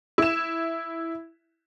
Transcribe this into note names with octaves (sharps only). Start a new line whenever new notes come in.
E4 E7